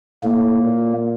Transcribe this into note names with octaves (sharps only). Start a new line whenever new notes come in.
A2 A#3
A#2